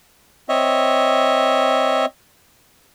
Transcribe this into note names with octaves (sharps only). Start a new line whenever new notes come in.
C4 C#5 D#5 E5